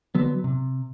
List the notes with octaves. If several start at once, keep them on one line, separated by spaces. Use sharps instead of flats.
D3 F#3 B3
C3